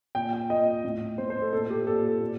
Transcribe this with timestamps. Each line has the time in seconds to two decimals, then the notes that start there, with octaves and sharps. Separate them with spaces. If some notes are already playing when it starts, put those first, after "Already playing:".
0.15 A#2 G5
0.33 G5
0.50 A#2 D#5
0.85 A2
1.18 A2 C5
1.30 C5
1.42 A4
1.53 A#2 A4
1.70 G4
1.87 A#2 A4
2.21 A#2